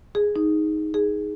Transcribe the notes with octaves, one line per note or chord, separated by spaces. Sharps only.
G#4
D#4
G#4